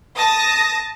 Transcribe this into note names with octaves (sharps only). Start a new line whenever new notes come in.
A5 D#6 A#6